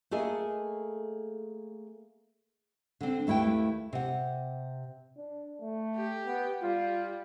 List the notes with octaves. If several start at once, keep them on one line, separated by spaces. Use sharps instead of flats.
A3 A#3 G#4 A4 D#5 G#5
D3 C4
D#2 A3 E4 B4 G5
C3 F#5
D4
A3
G4
B3
G3 F4